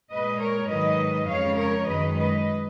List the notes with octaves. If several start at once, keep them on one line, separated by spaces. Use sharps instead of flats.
A#2 G#3 B4 D#5
A#4 C#5
G#2 D#3 F#3 B4 D#5
F2 C#3 F3 G#3 C#5 F5
A#4 C#5
F#2 D#3 G#3 B4 D#5
B4 D#5